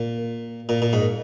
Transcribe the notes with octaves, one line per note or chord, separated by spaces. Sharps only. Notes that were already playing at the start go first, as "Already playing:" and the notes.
Already playing: A#2
A#2
A#2
G#2